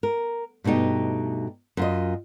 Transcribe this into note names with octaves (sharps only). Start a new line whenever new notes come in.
A#4
G2 B2 A3 D#4 G4
F#2 F4 D#5